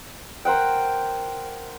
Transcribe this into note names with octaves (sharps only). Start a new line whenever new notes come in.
A#4 C5 F#5 G5